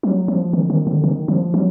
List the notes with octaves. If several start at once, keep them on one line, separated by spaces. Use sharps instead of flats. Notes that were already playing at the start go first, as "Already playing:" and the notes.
F#3
F3
D#3
D#3
D3
D#3
F3
F#3